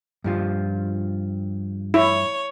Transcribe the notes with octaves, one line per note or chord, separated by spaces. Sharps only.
G2 F3 F4
E4 C#5